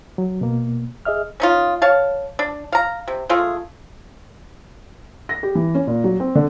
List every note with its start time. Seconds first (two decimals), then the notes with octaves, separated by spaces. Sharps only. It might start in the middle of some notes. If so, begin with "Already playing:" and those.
0.18 F#3
0.41 B2 A#3
1.05 G#4 D#5 E5 F6
1.40 C#4 D#4 F4
1.82 C#5 F5 A5
2.39 D4
2.72 F5 A#5
3.08 C3
3.29 G#3 A3 F4 G#4
5.29 A#6
5.43 G4
5.55 E3
5.75 C#4
5.87 A#2
6.04 F#3
6.20 C4
6.35 D3